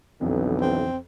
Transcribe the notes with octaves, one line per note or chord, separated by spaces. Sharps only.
B1 F2 D3 E3
C4